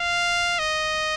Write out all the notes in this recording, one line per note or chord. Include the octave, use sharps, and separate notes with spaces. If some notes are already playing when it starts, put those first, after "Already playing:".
Already playing: F5
D#5